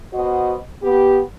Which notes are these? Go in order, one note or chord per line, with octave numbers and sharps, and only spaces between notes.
B2 F#4 C5 D#5
B3 G4